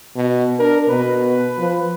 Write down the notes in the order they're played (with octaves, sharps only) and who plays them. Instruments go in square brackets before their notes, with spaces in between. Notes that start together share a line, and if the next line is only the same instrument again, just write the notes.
[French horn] B2
[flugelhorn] D4 [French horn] A#4
[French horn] B2 [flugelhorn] B4
[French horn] F3